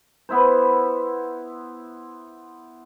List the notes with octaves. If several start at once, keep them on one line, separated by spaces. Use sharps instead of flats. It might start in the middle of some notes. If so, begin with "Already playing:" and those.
B3 E4 C5